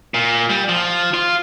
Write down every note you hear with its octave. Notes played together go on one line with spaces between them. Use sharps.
A#2
G3
F3
F4